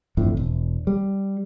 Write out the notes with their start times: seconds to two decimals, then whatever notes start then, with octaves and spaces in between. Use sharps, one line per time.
0.17 G1 F2 A2
0.37 E1
0.87 G3